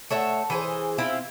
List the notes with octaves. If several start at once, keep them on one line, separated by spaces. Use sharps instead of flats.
A3 C#5 E5 F#5
E3 G#4 C5
C4 E4 F4